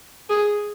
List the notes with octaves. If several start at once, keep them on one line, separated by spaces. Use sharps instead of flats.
G#4